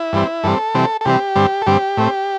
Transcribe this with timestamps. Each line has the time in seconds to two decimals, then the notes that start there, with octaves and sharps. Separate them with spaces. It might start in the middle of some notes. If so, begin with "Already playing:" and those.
Already playing: E4
0.13 G2 E3 G3 C4
0.44 G2 E3 G3 C4 A4
0.75 C3 E3 G3 C4
1.01 A4
1.05 C3 E3 G3 C4 G4
1.36 G2 D3 G3 C4
1.62 A4
1.66 G2 D3 G3 C4 G4
1.97 A2 A3 C4